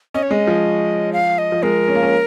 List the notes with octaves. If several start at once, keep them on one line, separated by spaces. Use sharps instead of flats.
C#4 D#5
C#5
G#3 D#5
F3
F5
D#5
F3
G#3 A#4
C#4
A#3
C#4